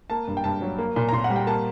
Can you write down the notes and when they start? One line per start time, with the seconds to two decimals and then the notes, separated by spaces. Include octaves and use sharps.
0.10 A#3 A5
0.28 G2
0.37 G5
0.44 G2 A5
0.62 F#3
0.78 A#3
0.96 A#2
1.09 A#5
1.12 A#2 C6
1.24 F#5
1.30 G3
1.36 G5
1.47 A#3 A5